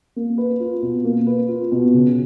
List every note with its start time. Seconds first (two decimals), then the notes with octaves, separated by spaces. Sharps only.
0.16 A#3
0.38 B4
0.60 F4
0.82 B2
1.04 A#3
1.27 B4
1.48 F4
1.72 B2
1.94 C#3